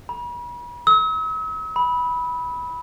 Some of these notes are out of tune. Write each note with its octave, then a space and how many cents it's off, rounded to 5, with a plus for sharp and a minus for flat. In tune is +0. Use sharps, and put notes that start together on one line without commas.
B5 -40
E6 -45
B5 -10